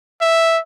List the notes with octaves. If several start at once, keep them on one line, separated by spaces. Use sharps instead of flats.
E5